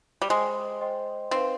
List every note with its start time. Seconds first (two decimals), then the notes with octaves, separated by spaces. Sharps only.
0.22 G3
0.30 G#3 C5 D#5 G5 C6
0.81 C5 D#5 G5 C6
1.31 C4 D#4 B4 F5